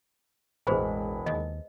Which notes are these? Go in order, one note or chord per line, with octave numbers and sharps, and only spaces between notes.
E1 A1 G#3 G#4 B4 C5 B5
D#2 D#5